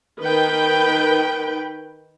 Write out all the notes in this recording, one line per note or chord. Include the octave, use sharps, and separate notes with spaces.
D#3 B4 G5